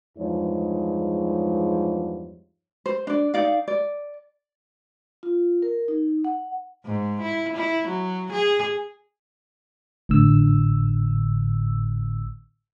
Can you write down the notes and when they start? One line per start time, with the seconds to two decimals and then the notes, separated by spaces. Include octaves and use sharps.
0.18 E2 G2 F3 G#3 D#4 C#5
2.86 C5
3.07 D4 D5
3.34 D#4 D5 F5
3.68 D5
5.23 F4
5.62 A#4
5.88 D#4
6.25 F#5
6.85 G#2
7.22 E4
7.56 E4
7.88 F#3
8.32 G#4
10.09 G#1 A2 D3 E6